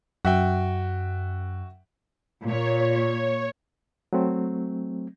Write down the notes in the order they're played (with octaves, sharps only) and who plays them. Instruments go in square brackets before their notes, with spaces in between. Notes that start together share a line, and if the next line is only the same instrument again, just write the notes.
[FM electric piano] F#2 [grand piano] F#4 E5 G5
[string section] A#2 [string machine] C#5
[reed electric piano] F#3 A3 C4